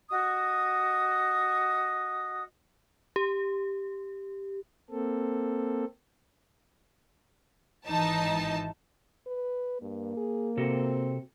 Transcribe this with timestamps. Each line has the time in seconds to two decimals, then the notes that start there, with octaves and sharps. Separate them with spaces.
0.10 F#4 D#5 D#6
3.16 G4
4.90 A#3 C4 A4
7.86 G#1 E3 D#4 A5
9.27 B4
9.82 G2 A#3
10.17 G#4
10.57 C3 C4 F#4 A4